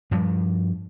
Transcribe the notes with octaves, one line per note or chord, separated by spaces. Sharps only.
G2 F3 G3